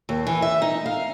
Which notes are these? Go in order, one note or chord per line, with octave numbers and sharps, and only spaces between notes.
D#2
E3
E5
D#4
F5